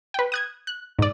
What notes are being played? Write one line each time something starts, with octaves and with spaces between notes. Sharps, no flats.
B4 G5
D#6 F#6 G#6
F#6
G#2 D5